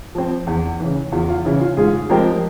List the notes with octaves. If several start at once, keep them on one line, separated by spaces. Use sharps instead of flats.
F3 C4
E2
C#3 E3
E2 F4
F4
C#3 E3 E4
F4
G#2 F4 G#4
F3 G#3 C4 G4 A#4